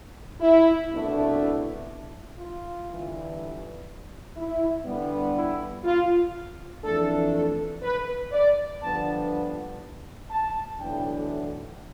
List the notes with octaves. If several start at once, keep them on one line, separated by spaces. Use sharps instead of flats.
E4
C2 B2 A3 D4
E4
F4
G1 G2 E3
E4
G2 D3 G3 B3
E4
F4
F2 E3 A3 D4 A4
A4
B4
D5
G1 G2 F3 B3 D4 A5
A5
B1 A2 E3 B3 D4 G5